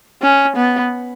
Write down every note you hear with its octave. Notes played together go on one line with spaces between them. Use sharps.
C#4
B3